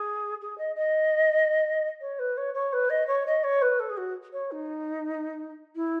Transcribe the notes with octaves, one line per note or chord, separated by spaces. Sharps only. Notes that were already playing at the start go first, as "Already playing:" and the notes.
Already playing: G#4
G#4
D#5
D#5
C#5
B4
C#5
C#5
B4
D#5
C#5
D#5
C#5
B4
A4
G#4
F#4
C#5
D#4
E4